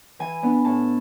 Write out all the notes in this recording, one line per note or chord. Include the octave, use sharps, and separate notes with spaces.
E3 G#5
B3 D4
A2 A5